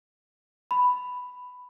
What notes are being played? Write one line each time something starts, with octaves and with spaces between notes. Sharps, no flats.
B5